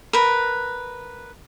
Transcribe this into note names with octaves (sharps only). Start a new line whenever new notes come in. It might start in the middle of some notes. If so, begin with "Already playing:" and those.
A#4 B4